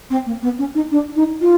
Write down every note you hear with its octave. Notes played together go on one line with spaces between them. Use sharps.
C4
A#3
B3
C#4
D#4
D4
D#4
F4